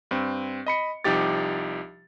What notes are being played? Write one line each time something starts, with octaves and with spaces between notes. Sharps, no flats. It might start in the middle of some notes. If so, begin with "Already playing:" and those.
G2 C4
D#5 B5 C#7
C2 F3 D#4 G4 D6 A6